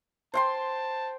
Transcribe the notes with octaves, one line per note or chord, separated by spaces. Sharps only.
C5 G5 A5 C6